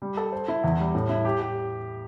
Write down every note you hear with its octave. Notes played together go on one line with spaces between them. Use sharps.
G3
A4
C5
E4
E2
G3
A2
E4
G4
G4